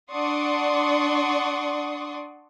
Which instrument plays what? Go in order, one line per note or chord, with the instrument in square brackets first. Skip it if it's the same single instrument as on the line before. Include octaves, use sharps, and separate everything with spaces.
[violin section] D4 D5 F#5 C6 C#6 D#6